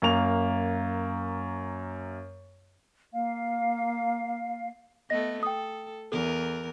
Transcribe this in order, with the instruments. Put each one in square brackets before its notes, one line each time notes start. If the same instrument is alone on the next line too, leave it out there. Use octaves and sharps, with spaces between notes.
[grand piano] F#2 A#3 F7
[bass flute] A#3 [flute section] F5
[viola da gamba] A3 B3 [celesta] D#5 A#6
[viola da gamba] A4 [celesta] G5 D#6
[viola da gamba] E2 A#4 [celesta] A4